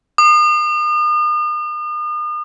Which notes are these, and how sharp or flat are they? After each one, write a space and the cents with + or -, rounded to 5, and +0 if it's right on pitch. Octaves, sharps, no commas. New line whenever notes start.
D#6 -40